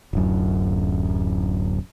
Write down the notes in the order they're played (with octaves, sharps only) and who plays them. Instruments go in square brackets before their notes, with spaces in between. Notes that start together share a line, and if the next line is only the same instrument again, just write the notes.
[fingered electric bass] D1 F#2